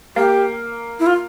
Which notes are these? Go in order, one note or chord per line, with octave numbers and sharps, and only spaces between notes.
A#3 G4
E4
F4